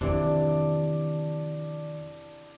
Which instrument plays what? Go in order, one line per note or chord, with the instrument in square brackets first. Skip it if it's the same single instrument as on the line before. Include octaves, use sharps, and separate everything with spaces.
[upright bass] F2 D#3 [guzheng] C3 E3 [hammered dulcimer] D4 D5